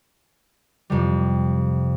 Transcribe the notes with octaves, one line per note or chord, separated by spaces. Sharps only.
F2 C3 G3